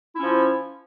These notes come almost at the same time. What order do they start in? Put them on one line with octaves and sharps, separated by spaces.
E4 C#4 F3